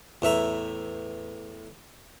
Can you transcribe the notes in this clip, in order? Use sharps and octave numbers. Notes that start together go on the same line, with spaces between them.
E2 A2 E5 A#5